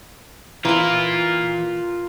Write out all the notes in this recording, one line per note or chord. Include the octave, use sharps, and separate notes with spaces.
E3 E4 F4 A#4